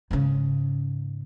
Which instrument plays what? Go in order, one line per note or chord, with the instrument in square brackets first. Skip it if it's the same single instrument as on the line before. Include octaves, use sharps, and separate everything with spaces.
[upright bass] G#2 C#3